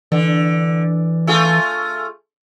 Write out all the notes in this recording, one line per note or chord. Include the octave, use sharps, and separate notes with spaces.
D3 E3
A3 F4 G#4